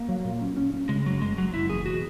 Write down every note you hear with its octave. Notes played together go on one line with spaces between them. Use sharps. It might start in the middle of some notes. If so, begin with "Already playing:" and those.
Already playing: A#3
F#3
A#2
C#4
C#4
C#4
C#3 G#3
F#1 F#3
F#1 G#3
F#1 F#3
F#1 E4
E2 G#4
B2 F#4